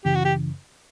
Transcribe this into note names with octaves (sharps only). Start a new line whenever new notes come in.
F#2 C#3 E3 G4
F#4
G4